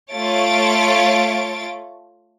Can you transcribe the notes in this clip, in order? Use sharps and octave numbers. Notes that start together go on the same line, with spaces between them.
A3 F4 C#5 A6 D7